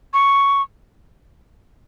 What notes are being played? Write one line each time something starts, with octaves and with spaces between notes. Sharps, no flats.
C#6